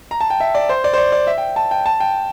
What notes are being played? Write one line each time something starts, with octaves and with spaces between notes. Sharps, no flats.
A#5
A5
G5
E5
D5
C5
D5
C5
D5
D5
E5
G5
A5
G5
A5
G5